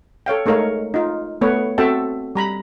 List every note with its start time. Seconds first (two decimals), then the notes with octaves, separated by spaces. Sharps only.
0.26 A4 C#5 F5 G5
0.46 G#3 A3 D#4 A#4 C#5 F5
0.94 D#4 F4
1.41 A3 B3 B4 C#5
1.78 C4 F#4 A4 E5 G5 A5
2.35 G3 A#5 B5